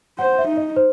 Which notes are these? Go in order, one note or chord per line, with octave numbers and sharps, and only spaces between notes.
C5 F#5
E5
D#4
D#5
C5